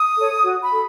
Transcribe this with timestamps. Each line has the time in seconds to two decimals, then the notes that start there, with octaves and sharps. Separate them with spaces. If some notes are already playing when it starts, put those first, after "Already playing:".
Already playing: D#6
0.16 A4 C#5
0.44 F#4
0.62 B5
0.72 A4